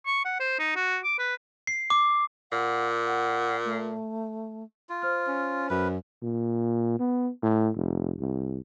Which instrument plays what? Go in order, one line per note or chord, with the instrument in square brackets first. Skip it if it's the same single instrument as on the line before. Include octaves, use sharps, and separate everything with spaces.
[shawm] C#6
F#5
C5
D#4
F#4
D6
B4
[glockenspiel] C7
D6
[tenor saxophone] A#2 [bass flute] F#5
[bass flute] F#5
A3
[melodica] F4
[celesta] C5 F6
[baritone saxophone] C#4
[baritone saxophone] F#2 [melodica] B4
[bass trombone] A#2
B3
A2
F1
C2